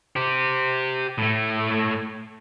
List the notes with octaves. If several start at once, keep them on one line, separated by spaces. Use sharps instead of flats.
G4 C5
A2 A3